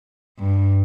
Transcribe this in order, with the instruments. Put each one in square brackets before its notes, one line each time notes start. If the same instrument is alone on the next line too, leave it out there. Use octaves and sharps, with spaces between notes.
[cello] G2